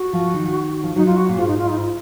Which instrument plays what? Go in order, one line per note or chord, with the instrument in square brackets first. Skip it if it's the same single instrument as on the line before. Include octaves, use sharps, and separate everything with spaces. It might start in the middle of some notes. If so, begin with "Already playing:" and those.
Already playing: [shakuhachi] F#4
[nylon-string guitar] F3
D#3
F3
[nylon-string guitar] F#3 [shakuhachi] D#4
[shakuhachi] F4
F#4
[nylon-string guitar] A#2
[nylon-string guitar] G#2 [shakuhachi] F4
[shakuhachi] D#4
F4
D#4
F4